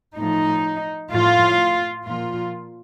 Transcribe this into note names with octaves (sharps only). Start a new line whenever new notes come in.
A2 F3 D#4
A2 F3 F4
A#2 F3 F4